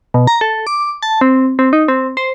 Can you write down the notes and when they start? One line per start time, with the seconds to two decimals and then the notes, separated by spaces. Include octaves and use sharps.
0.14 B2
0.27 A#5
0.41 A4
0.67 D6
1.02 A5
1.21 C4
1.59 C4
1.73 D#4
1.88 C4
2.17 C5